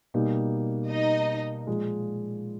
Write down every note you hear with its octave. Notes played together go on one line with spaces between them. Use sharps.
B2 G3 A#3 D#4
D#4 D#5
A#2 F3 G#3